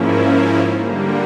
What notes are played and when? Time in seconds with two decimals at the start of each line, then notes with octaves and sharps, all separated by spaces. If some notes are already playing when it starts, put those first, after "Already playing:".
Already playing: G#2 F3 A#3 C#4 E4
0.78 D3 G3 A#3